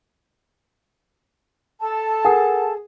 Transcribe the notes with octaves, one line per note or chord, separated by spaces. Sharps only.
A4 A5
G#4 A#4 F#5